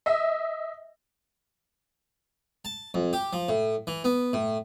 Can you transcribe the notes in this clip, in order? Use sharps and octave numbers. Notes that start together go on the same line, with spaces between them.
D#5 E5
A5
F2
G4
F3
A2
E3
B3
A2